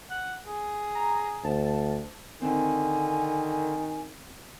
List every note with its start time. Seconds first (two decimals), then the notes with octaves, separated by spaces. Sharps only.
0.10 F#5
0.47 G#4
0.95 A#5
1.44 D2 A5
2.42 D3 D#3 C4 G#5 A5